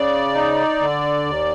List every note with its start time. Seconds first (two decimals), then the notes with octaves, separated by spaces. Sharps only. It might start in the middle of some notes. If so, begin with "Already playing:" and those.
Already playing: C#3 D5
0.35 D#4
0.80 D3
1.26 D#2